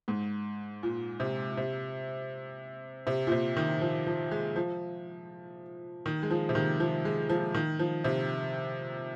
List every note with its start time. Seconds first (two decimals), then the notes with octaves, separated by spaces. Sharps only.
0.08 G#2
0.83 A#2
1.20 C3
1.57 C3
3.07 C3
3.27 A#2
3.32 C3
3.57 D#3
3.81 F3
4.07 F3
4.31 G#3
4.56 F3
6.06 D#3
6.23 G#3
6.30 F3
6.49 C3
6.55 D#3
6.80 F3
7.05 G#3
7.29 F3
7.54 D#3
7.79 F3
8.04 C3